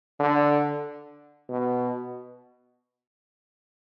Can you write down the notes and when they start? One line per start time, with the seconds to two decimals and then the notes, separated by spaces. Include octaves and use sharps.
0.19 D3
1.49 B2